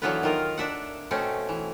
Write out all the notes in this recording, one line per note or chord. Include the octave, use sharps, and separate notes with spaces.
D3 E3 F#3 B3 F4 B4
D#3 F4 A#4
D4 E5 F#5
B2 A3 C4 C#4
E3